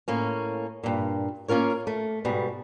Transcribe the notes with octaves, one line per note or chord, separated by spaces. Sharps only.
A2 A#3 C#4
G2 A#2
A#3 C#4 F4 A#4 C#5
A3
G#2 B2 G3